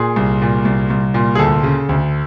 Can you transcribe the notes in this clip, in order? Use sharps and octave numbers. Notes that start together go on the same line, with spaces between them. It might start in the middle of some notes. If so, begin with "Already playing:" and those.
Already playing: A#2 G#4
C2
A#2
C2
C2
A#2
G#4
D2 A4
C#3
D2